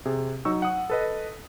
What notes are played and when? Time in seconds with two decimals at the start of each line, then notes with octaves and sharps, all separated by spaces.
0.05 C3 G#4
0.45 F#3 D#4 C#6 E6
0.62 F#5 D#6
0.90 A4 B4 D#5